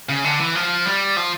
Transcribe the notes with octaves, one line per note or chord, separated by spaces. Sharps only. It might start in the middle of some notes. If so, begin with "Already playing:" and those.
C#3
D3
E3
F3
G3
F3